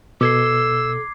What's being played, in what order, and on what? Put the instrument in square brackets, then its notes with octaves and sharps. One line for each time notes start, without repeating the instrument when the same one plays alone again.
[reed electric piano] B2 [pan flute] A4 [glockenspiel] D6 G#6 C7 [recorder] E6